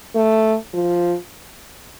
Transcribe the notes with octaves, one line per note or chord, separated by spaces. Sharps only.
A3
F3